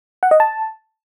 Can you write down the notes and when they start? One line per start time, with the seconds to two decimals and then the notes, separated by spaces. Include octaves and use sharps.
0.23 F#5
0.31 D#5
0.40 A5